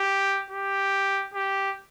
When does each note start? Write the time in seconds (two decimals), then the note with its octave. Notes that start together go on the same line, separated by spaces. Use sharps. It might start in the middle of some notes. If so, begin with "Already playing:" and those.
Already playing: G4
0.50 G4
1.34 G4